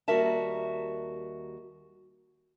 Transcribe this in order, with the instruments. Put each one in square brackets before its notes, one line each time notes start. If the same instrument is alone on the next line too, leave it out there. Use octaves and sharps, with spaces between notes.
[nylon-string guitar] D#2 G3 F#4 A#4 E5 A5